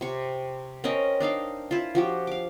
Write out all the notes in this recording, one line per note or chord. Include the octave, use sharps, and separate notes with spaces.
C3 C#6
C4 C#4 A#4 D#5
D4 D#4 F5 G5
E4 F4
F3 F#4 G4
F5 D6